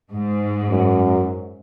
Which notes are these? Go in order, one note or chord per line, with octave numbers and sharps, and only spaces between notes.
G#2
F#2